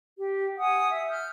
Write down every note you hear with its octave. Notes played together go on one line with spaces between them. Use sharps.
G4
F#5 G#5 D#6
E5
F6 G6